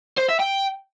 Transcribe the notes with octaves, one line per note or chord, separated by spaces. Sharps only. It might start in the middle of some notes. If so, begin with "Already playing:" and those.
C5
E5
G5